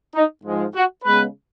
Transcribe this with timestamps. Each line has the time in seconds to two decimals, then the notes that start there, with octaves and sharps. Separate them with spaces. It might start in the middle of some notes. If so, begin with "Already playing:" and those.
0.15 D#4
0.44 G#2 F3 G#3
0.74 F#4
1.04 C#3 G#3 B3 B4